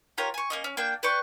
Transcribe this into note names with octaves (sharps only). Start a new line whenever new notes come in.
F4 G4 A#4 C#5
G#5 C#6
A#3 C#4 D#5
C#4
A#3 D4 G5
B4 D5 G5 C#6